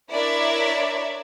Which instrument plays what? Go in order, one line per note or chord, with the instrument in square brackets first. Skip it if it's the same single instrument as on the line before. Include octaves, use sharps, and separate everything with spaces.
[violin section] D4 E4 A#4 C#5 D5 E5